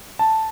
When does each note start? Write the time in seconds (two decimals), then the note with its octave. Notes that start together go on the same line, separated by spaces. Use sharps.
0.19 A5